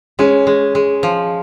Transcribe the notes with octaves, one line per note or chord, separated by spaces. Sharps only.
G#3 C#4
G#3
G#3
F3